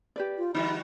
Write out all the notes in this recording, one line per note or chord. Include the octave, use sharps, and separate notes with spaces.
G4 B4 D5
F4
D3 G3 D#4 F#4 E5 B5